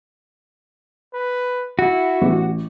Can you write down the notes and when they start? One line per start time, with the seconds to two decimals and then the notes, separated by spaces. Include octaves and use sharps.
1.13 B4
1.79 E4 F#4
2.22 A1